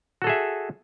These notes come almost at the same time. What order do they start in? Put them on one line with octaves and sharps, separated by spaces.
F#4 A4 G#4 E5